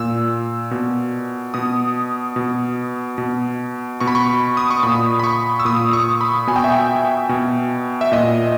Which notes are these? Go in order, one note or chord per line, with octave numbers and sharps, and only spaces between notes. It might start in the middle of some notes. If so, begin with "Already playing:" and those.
Already playing: A#2 E6
B2
B2 D#6
B2
B2
B2 C#6
B5
C#6
D#6
C#6
A#2 B5
B5
C#6
E6
A#2 D#6
C#6
B5
B2 G#5
G5
E5
G5
B2
E5
A#2 D#5